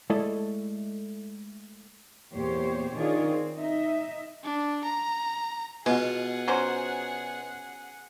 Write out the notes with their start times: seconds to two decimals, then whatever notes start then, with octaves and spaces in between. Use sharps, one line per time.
0.10 G#3 A3 E4 A4 D5 D#5
2.33 E2 A#2 G4 C5 C#5
2.95 D#3 D4 F4 G#4 C#5 D5
3.27 C4
3.58 D#4 D#5 E5
4.44 D4
4.84 A#5
5.86 B2 G#3 B3 F4 F#4 G#4 F#5
6.48 F#3 C#4 C5